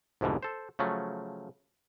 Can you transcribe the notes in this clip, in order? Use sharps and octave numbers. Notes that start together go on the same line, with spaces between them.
C2 F2 G#2 B2 D3
A4 C5
C#3 F3 F#3 A3